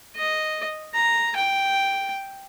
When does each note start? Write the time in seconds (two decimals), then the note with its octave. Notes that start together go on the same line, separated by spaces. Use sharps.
0.16 D#5
0.94 A#5
1.36 G5